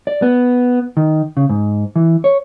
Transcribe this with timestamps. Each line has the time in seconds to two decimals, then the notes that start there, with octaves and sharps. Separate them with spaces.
0.07 D5
0.22 B3
0.97 D#3
1.37 C#3
1.49 G#2
1.96 E3
2.24 C#5